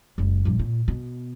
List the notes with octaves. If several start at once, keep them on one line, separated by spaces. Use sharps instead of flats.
F#1 C#2
A#1 G2
A#2
B2